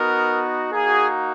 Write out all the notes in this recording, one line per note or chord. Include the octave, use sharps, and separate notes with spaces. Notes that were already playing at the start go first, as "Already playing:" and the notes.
Already playing: B3 D#4 F#4 A#4
A#3 D#4 F#4 G#4